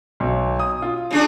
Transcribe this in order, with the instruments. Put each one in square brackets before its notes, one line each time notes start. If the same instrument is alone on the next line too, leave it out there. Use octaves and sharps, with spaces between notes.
[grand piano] B1
D#6
F4
[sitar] C#3 D4 G#4